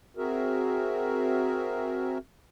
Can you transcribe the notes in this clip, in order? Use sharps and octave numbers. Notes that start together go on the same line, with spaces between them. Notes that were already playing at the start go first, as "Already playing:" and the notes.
C4 F#4 G#4 A#4 E5